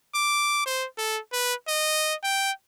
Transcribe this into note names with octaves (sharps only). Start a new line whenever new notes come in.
D6
C5
A4
B4
D#5
G5